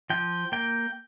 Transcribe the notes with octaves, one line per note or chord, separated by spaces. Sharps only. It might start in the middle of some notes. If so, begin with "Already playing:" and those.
F3 G5
A#3 G5